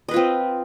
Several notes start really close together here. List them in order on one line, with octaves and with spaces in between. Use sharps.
D#5 B4 F4 C4